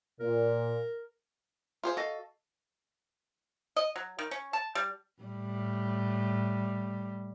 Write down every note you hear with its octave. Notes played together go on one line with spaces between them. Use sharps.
A#2 A#4
F4 G#4 C5
F#4 A4 D#5 F5
D#5
F#3
D#3
C#4
A5
G3
A2 G3